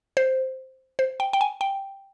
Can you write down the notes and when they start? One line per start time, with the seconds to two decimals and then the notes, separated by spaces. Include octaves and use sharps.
0.17 C5
0.99 C5
1.20 G5
1.33 G5
1.41 G#5
1.61 G5